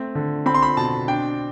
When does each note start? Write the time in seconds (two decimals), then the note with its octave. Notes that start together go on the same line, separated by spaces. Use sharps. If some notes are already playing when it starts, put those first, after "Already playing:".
Already playing: A3 C4
0.15 D3
0.46 C4 B5
0.54 C6
0.62 B5
0.77 B2 A5
1.08 D4 G5